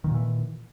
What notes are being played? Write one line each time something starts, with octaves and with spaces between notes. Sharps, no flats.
A#2 D#3 E3